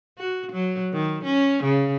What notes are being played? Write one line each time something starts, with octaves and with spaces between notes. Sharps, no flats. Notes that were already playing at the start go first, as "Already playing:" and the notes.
F#4
F#3
D#3
C#4
C#3